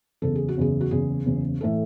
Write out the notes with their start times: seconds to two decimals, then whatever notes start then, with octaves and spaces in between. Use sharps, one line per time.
0.22 F#1 E2 C#3 A4
0.36 G#4
0.48 F#4
0.57 F#1 E2 C#3 G#4
0.81 F#4
0.91 F#1 E2 C#3 G#4
1.26 F#1 E2 C#3
1.61 A2 E3 A3 A4